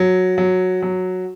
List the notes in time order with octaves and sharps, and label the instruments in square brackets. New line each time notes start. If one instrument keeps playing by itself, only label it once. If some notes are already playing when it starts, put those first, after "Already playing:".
Already playing: [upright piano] F#3
F#3
F#3